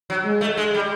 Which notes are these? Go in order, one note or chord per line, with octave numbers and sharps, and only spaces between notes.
F#3
G#3
A3
G#3
G3